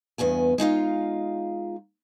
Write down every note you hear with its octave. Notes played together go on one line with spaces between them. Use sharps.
E2 G2 B3 G#5
G#3 D#4 F4 F5